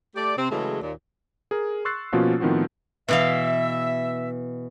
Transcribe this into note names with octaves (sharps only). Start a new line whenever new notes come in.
A3 G4 D5
C3 C4
C#3 E3 F#3 G#3 A3
D#2 A#2
G#4 A#4
C6 C#6 E6 F#6 A6 C7
B2 F3 A#3 C#4 F4 F#4
A2 D#3 F3 B3 C4 F#4
B2 E3 E5 F5